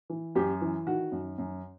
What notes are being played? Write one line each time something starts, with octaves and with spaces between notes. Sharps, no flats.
E3
F#2 G4
E3
D#3 F#4
F#2
F#2